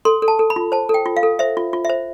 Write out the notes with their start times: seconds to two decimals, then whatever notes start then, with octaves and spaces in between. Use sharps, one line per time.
0.05 A4 C6
0.22 A4
0.28 A5
0.39 A4
0.50 B5
0.56 F4
0.72 C5 A5
0.89 A4 G5
1.06 F4
1.17 F5
1.23 A4
1.39 C5 E5
1.57 F4
1.73 F4
1.85 C5 E5